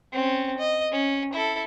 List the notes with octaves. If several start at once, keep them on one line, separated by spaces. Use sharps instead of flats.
C4 C#4
D#5
C#4
E4 A4